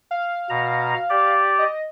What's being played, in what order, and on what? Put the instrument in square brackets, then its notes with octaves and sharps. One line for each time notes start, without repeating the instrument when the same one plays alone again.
[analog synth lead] F5
[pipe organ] B2 A#5
G4 D5
[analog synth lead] D#5